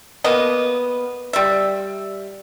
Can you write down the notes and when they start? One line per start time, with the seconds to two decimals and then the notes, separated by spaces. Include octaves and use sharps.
0.24 A#3 B3 D#5
1.33 G3 E5